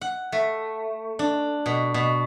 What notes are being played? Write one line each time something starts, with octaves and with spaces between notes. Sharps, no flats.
F#5
A3
D4
B2
B2